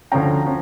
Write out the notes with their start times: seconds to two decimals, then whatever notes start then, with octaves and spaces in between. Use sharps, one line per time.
0.12 D2 D3 F3 C#4 G5 A#5
0.45 F3 C#4